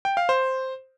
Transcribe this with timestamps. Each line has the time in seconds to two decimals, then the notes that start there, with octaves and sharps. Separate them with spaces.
0.05 G5
0.17 F5
0.29 C5